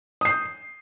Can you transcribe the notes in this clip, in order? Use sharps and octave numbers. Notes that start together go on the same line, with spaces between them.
D#6 G6 C7